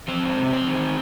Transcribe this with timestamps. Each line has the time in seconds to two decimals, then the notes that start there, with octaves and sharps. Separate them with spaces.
0.08 F3 C4 C5
0.23 G#2
0.38 C3
0.52 F2 C4 C5
0.67 D#3